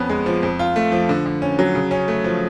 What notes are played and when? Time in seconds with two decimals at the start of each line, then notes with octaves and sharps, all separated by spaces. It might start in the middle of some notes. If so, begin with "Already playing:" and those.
Already playing: F2 B3 C#4
0.10 G#3
0.26 F3
0.43 F2
0.59 F4
0.76 A3
0.92 F3
1.09 D3
1.26 D3
1.42 C#4
1.59 F#3
1.75 C#3
1.91 C#4
2.08 A3
2.24 F3